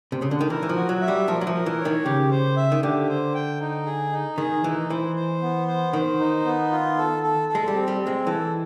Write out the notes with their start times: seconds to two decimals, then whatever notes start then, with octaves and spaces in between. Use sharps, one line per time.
0.12 C3
0.22 C#3
0.31 D3
0.41 D#3
0.50 E3 A#4
0.63 E3
0.69 F3
0.76 F#4
0.89 F#3
1.01 E5
1.08 G3
1.28 F3 A#4
1.41 F#3
1.47 F3
1.54 A#4
1.66 E3
1.80 C#5
1.85 D#3
2.05 C#3 G4
2.31 C5
2.57 E5
2.72 D#3
2.83 D3 G4
3.09 C5
3.34 G5
3.61 D#4
3.86 G#4
4.12 D#4
4.38 D#3 G#4
4.64 E3 D#4
4.90 E3 C5
5.16 C5
5.42 B3
5.68 C5
5.93 D#3 C5
6.20 D#4
6.45 B3
6.71 F4
6.97 A4
7.23 A4
7.49 A4
7.55 G#3
7.68 G3
7.74 C4
7.88 G3
8.01 C4
8.07 G#3
8.27 E3 A4